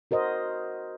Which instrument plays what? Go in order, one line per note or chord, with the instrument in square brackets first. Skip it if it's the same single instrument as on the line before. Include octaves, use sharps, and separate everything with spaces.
[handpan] F#4 A#4 C5 D#5